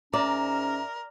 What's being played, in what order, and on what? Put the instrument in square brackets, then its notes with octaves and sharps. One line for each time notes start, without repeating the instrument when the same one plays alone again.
[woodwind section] G#2 C#4 [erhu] A#4 [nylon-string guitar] D5 [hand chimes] E5 A#5